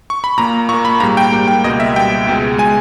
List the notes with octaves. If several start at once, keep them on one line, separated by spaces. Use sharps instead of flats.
C#6
B5
A#2 A#3 A#5
A#2 C#6
A#3
B5
G#2 G3 A#3 A#5
G5
G#2 G3 A#3
G5
C#2 B2 G3 A#3 D#5
E5
C#2 B2 G3 A#3 G5
C#2 B2 G#3
B2 G#3 G#5